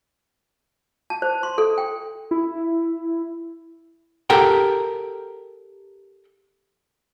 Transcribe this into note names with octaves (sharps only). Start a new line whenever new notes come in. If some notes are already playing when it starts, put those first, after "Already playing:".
A5
C5
C6
A4
G5
E4
G4 A4 A#4 F#5 G5